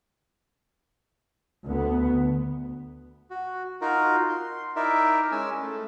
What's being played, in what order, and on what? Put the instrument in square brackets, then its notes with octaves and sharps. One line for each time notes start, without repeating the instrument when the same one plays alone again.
[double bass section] D2 B3
[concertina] F#4
D#4 F4 F#4 A#4
C6
D#4 E4 A#4 D5 E5
G#3 C#4 G#5 E6
A3